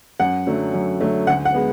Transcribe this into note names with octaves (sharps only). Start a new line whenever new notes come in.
F#2 F#5
D3 F#3 A3
F#2
D3 F#3 A3
D2 F#5
F#5
G#3 B3